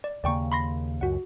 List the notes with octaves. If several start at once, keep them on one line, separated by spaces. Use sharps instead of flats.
D5
D#2 C#3 A#3 D5 G5 C#6
B5 C6 A#6
C#2 F#2 F#4 F#5